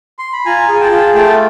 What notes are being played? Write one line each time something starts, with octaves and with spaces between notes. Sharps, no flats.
C6
B5
F4 G#5 A#5
G#4 G#5
G5 A5
F4
A3 G5 A5